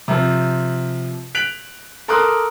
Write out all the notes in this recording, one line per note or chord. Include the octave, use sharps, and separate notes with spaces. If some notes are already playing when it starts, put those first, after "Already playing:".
C3 F3
F#6 B6 D7 F7 F#7
A4 A#4 C6 D6 D#6 F#6